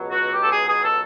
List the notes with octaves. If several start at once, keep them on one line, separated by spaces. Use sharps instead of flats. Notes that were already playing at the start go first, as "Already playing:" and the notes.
Already playing: C#2 B2 F#3
F#4
G4
A4
G#4
G#4
A4